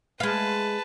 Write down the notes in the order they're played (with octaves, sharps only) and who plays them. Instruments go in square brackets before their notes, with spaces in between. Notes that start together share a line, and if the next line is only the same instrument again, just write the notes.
[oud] G#3 F5 [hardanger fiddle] B4 A5